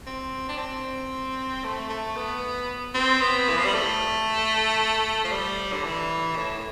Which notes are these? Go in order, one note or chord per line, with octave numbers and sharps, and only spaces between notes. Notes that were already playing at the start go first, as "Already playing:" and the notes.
C4
D4
C4
A3
A3
B3
C4
B3
E3
F3
G3
A3
F3
G3
D3
E3
A2